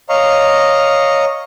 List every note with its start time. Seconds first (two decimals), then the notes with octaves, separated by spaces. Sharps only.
0.09 C#5 D#5 F5 A#5